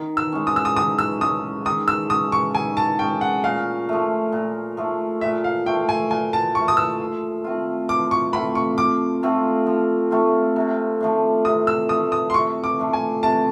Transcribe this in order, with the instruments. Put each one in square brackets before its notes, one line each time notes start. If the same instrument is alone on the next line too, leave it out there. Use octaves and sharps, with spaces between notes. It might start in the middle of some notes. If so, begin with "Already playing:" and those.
Already playing: [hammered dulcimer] D#3
[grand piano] E6
[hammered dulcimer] G#3 C#4
[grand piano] D#6
E6
D#6
[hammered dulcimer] D#3 [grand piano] D#6
[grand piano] E6
[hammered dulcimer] G#3 C#4 [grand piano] D#6
[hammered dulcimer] D#3 [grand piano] D#6
[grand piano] E6
[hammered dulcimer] G#3 C#4 [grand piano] D#6
[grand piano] C#6
[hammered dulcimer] D#3 [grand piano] G#5
[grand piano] A5
[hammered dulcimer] G#3 C#4 [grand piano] G5
[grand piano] F#5
[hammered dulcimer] A#2 [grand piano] F5
[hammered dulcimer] F3 A3
A#2
F3 A3
[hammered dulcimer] A#2 [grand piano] E5
[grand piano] F5
[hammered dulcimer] F3 A3 [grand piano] G5
[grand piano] G#5
[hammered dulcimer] A#2 [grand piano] G#5
[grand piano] A5
[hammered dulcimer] F3 [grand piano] C#6
[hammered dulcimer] A3
[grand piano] D#6
E6
[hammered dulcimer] F3
A3 C4 F4
[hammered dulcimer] F3 [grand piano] D6
[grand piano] C#6
[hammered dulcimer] A3 C4 F4 [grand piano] B5
[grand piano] C#6
[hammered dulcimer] F3 [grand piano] D6
[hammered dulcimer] A3 C4 F4
F3
A3 C4 F4
C3
F3 A3 D4
[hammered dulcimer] C3 [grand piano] D#6
[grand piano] E6
[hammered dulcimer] F3 A3 D4 [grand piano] D#6
[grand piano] D#6
C6
[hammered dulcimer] C3 [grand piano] C#6
[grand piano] D6
[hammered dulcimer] F3 A3 D4
[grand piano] G#5
[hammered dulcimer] C3 [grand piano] A5